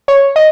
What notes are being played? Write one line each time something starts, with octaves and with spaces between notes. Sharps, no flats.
C#5
D#5